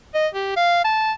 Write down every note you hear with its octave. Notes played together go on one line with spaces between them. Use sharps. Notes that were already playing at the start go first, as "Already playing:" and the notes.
D#5
G4
F5
A5